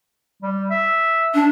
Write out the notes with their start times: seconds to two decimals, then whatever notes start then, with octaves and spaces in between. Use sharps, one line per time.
0.43 G3
0.70 E5
1.34 D4